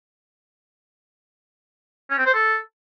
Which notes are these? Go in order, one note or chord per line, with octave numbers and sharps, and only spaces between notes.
C#4
C4
C5
A4